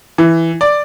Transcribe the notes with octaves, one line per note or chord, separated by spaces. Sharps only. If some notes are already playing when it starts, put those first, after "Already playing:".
E3
D5